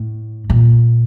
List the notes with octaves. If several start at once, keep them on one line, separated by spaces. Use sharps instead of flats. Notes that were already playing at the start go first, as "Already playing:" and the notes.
Already playing: A2
A#2